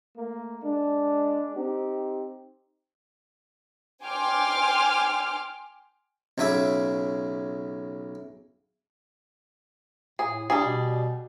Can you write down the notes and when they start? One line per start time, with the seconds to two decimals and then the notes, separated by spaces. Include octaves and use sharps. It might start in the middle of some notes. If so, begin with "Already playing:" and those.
0.16 A3 A#3
0.63 G#3 D4
1.55 C4 D#4 G4
4.03 G5 G#5 C6 D6 F6
6.38 B1 C#3 G#4 E5 D6
10.19 A2 G#4
10.50 G3 D4 G#4
10.65 B2